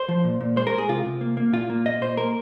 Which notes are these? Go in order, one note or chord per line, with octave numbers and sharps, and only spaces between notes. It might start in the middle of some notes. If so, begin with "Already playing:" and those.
Already playing: C5
F3
A#2
A#2
G#3 C5
A#4
G#3
G#4
C3 F4
C3
A#3
A#3
A#2 F4
A#3
A#2 D#5
A#2 C5
A#3 A#4